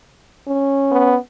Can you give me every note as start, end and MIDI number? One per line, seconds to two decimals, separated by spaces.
0.48 1.16 61
0.92 1.16 59